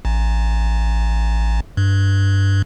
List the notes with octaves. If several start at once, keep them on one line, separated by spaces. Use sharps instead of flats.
A1
G2